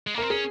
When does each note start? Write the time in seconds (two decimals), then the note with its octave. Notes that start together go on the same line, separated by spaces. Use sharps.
0.07 G#3
0.14 A#3
0.18 C4 A#4
0.30 C#4 G#4